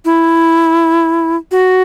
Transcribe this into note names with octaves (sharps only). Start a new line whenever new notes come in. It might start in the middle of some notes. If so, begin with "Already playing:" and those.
E4
F#4